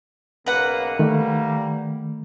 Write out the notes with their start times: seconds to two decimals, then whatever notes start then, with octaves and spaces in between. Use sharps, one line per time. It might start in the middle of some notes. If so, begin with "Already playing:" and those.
0.46 B1 C#3 A#3 B4 F#5
0.99 D#3 G3 A3 A#3